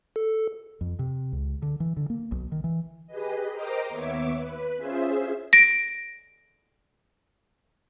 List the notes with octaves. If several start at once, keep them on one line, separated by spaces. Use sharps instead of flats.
A4
F2
C3
C#2
D3
E3
D3
A#3
B1
D#3
E3
G4 G#4 B4 D#5
A#4 C5 D#5 G5 A#5 D6
D#2 B3 C#5 E5 D6
B4
C#4 F4 G#4 C5 E5
A#6 D7